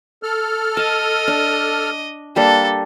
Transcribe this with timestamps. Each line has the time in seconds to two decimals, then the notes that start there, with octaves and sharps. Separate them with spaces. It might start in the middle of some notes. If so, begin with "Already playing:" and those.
0.23 A4 F6
0.77 D#5 A5
1.27 D4
2.36 G3 A#3 D4 A4